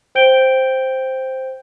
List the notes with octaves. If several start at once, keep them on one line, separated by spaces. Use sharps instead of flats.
C5 G5 G6 D7 G7